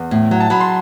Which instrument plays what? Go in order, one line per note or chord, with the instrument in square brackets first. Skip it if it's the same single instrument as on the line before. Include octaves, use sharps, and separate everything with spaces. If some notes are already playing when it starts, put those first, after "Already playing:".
Already playing: [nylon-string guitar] E2
A2
F#3
[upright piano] A5
[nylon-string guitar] F#3 [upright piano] B5
[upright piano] C6